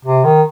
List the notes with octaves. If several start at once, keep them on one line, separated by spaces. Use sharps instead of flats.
C3
D#3